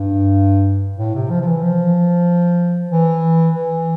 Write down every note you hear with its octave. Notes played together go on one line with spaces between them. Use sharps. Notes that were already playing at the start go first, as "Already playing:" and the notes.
Already playing: G2
A2
C3
F3
F3
E3
F3
E3
E3